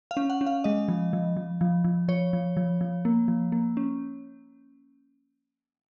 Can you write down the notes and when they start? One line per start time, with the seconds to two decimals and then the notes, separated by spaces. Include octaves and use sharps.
0.11 F5
0.17 C#4
0.30 F#5
0.41 C#4
0.46 F5
0.64 G#3 D#5
0.88 F3
1.13 F3
1.37 F3
1.61 F3
1.84 F3
2.08 F3 C#5
2.33 F3
2.57 F3
2.81 F3
3.05 A#3
3.28 F3
3.52 A#3
3.77 C#4